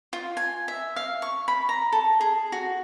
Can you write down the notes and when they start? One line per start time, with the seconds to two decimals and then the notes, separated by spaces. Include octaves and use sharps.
0.13 F4
0.37 G#5
0.68 E5
0.96 F5
1.22 C#6
1.48 B5
1.69 A#5
1.92 A4
2.21 G#4
2.52 F#4